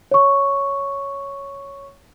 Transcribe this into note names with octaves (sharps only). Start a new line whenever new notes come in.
C#5 C#6